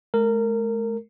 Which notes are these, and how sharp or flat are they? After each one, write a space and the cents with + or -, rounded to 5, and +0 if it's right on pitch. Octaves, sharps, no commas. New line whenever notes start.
G#3 +45 A#4 -20